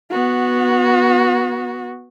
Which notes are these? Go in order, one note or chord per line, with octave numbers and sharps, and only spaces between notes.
B3 F#4